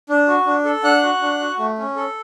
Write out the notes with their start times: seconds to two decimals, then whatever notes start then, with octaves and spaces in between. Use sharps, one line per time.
0.09 D4
0.28 F#4
0.46 D4
0.65 A4
0.83 D4 F#5 F#6
1.03 F#4
1.22 D4
1.40 F#4
1.58 A3
1.78 C#4
1.96 A4